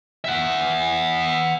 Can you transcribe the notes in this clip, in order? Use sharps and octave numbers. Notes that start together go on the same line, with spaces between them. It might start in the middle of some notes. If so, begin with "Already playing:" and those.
E5 F#5